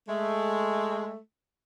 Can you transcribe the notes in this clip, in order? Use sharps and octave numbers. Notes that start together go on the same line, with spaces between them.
G#3 A3